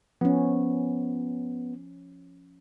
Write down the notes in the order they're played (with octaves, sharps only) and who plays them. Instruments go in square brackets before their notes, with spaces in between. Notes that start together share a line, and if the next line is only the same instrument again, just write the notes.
[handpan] F3 C#4 [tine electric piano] B3